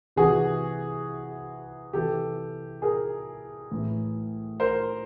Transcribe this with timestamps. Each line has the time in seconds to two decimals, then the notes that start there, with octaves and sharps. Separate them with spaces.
0.16 C3 E3 F#4 G#4
1.93 C3 E3 G4 A4
2.82 G#4 A#4
3.71 A2 E3
4.60 A#4 C5